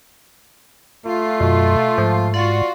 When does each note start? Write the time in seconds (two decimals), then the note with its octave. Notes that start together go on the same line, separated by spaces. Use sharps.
1.06 A3 F4
1.40 F#2 B2
1.98 G#2 F3
2.34 F4 F#4 D5